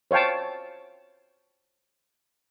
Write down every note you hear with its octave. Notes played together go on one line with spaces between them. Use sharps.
C5 C#5 F5 G5 A5